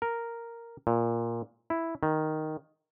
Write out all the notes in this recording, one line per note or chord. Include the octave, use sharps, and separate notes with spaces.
A#4
A#2
E4
D#3